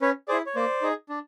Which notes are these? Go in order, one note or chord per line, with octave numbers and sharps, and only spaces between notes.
C#4 B4 C#5
E4 G#4 C5 D5
C#5
A#3 C5 D5
D#4 G#4
D4